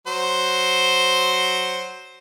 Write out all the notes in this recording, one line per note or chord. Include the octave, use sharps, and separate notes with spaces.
F#3 C5